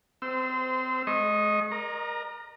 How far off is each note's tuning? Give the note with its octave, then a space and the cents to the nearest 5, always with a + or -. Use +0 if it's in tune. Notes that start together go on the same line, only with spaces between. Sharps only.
C4 -30 C5 -20 E6 +0
G#3 +40 D#5 +0 C#6 -35
A#4 +25 D#5 -45 A#5 +0